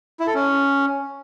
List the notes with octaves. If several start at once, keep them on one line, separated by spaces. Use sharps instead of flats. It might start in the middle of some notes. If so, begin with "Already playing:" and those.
E4
A4
C#4